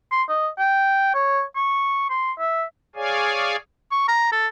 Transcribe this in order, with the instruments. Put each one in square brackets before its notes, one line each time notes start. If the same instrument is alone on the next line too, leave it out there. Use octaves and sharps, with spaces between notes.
[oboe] C6
D#5
G5
C#5
C#6
C6
E5
[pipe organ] G#4 C#5 D5 F5 G#5
[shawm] C#6
A#5
A4